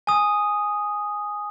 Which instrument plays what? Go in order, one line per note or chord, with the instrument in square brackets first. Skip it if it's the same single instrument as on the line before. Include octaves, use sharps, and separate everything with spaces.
[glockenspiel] G#5 D#6